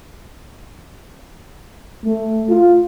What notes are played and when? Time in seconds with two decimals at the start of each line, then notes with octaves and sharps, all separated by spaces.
2.05 A3
2.49 F4